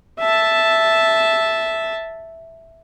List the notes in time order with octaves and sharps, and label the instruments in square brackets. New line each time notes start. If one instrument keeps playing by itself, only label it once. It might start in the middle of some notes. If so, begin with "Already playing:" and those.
[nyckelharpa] E5 A5